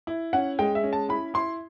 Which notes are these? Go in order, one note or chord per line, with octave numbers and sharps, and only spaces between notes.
E4
C#4 F#5
G#3 G5
E5
C#4
A5
E4 B5
E4 C6